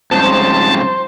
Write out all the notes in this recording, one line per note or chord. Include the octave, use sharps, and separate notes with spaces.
F2 G#2 C#3 G3 C5 A5